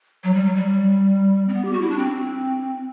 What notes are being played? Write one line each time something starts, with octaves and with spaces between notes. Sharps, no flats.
F#3
G3
F#3
G3
C4
B3
G4
F#4
E4
D4
C4